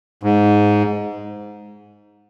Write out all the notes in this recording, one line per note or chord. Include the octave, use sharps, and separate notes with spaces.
G#2